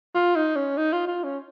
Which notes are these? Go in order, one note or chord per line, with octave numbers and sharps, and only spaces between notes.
F4
D#4
C#4
D#4
F4
F4
C#4